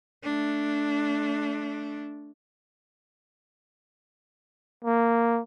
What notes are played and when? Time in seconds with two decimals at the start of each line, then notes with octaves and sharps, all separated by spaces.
0.23 A3 D4
4.85 A#3